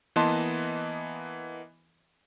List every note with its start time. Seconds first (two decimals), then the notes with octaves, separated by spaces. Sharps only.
0.16 E3 A#3 B3 D#5 A5 C6